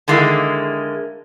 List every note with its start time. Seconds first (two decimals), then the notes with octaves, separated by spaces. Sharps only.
0.08 D3 D#3 G#3 A#3 E4